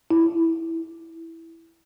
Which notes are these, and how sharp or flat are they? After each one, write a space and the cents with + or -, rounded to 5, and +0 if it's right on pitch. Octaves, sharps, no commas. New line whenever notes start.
E4 -5